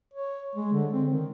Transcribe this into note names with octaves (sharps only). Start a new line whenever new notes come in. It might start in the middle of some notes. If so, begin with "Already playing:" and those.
C#5
G#3
D3
C4
D#3